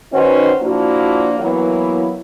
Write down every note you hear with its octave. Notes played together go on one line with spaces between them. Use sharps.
D#3 C#4 D#4 F#4 B4 C5
F3 A#3 D4 E4 F#4
E3 F#3 A#3 B3 E4